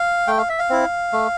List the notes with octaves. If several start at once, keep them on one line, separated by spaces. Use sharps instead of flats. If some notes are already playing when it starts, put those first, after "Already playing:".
Already playing: F5
A3 G5
F5
E5
F5
C4 E4
A3